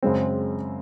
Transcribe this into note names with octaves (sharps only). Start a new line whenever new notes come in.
F#2 C#3 G#3 C4